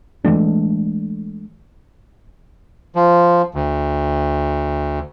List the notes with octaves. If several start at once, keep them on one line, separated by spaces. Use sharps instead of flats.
E3 G#3 A3 D4
F3
D2